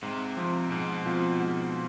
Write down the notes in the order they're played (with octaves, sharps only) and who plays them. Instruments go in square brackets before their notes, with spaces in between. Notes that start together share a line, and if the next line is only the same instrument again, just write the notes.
[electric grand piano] G#2 [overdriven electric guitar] C3
[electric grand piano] F3 C4 F4
[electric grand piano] G#2 [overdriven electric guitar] B2
[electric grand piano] F3 C4 F4
G#2